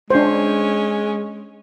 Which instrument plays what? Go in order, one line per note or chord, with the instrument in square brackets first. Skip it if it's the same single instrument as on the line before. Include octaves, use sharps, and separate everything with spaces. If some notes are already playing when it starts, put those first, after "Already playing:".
[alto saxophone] G#3 [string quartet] C#4 [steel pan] D4 C5